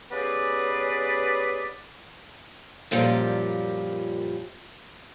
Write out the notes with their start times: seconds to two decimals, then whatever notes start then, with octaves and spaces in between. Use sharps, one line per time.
0.11 B3 C#4 G4 G#4 B4 D5
2.91 F#2 A#2 F3 G3